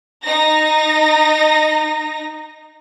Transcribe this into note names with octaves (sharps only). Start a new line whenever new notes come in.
D#4 A#6